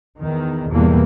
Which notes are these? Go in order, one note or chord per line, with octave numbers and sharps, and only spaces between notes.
E2 D#3
E2 G#2 B2 E3 G3 A#3